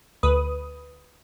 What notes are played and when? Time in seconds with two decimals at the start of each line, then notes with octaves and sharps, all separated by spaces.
0.23 D2 B4 D#6